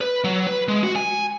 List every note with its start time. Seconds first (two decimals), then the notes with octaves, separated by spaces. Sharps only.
0.01 B4
0.24 F#3
0.47 B4
0.68 G#3
0.84 F#4
0.96 G#5